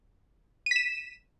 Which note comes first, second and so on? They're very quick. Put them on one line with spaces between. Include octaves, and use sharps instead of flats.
D#7 B6 E7